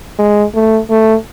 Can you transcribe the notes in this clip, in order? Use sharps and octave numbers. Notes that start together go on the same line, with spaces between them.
G#3
A3
A3